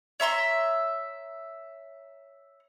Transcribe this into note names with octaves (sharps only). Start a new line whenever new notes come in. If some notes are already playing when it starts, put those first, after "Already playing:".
C#5 E5 A#5 C6